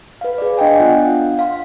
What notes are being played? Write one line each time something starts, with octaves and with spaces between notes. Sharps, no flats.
B4 F5
G#4 D5
D4 D#5 G5 G#5
B3 D4 F4 F5 F#5
F5 C6